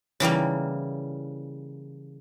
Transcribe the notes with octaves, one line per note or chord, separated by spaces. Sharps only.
C#3 E3 G3 A#3